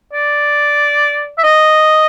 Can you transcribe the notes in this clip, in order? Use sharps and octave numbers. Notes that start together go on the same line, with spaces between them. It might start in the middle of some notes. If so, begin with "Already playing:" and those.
D5
E5
D#5